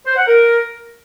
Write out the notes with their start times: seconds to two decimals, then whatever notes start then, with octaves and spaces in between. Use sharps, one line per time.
0.06 C5
0.17 F#5
0.27 A#4